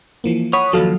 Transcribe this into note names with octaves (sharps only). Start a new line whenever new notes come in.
E3 F3 A#3
C#5 F#5 B5 D#6
D#2 A#2 F3 F#3 A4 F5